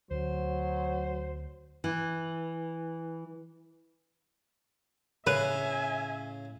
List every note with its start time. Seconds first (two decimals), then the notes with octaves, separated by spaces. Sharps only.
0.11 D2 F#3 C5
1.84 E3
5.27 A2 C#3 B4 E5 G#5